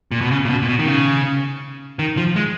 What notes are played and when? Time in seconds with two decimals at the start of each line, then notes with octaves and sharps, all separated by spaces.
0.12 A#2
0.21 B2
0.31 C#3
0.45 A#2
0.50 B2
0.62 A#2
0.69 B2
0.79 D#3
0.87 C#3
1.99 D#3
2.17 F3
2.36 G#3